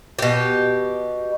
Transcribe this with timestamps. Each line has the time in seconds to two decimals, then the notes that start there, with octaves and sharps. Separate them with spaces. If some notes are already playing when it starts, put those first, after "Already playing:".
0.19 B2 G4